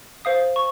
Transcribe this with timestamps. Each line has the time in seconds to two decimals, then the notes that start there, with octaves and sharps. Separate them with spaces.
0.25 C5 F5 D#6
0.56 C#6